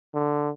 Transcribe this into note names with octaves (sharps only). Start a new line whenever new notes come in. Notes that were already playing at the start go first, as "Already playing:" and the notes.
D3